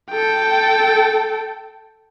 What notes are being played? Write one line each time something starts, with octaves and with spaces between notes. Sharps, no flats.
A4 G5